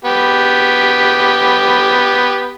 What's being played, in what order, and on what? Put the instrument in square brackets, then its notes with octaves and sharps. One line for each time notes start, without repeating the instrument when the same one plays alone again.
[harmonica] B3 G4